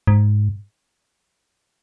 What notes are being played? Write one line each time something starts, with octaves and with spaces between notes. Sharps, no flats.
G#2